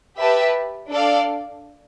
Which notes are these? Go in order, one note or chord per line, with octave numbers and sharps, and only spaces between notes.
G4 B4 E5 A5
D4 A4 D5 F5